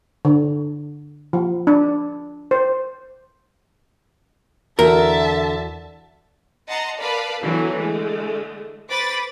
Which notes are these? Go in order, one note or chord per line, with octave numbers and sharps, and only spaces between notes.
D3
F3
D4
C5
E2 D3 E3 F#4 A#4 E5 A5
D#5 F#5 A5 A#5 C6
A#4 B4 D5 F5 A5 B5
D3 E3 F#3 B3
D3 G#3 A3
B4 C5 B5 D6 A6